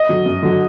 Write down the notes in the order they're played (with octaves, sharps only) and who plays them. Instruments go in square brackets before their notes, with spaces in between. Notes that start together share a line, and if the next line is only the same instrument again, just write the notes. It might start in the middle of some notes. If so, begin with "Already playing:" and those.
Already playing: [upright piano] D#5
[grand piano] D3 F#3
F#2
D3 F#3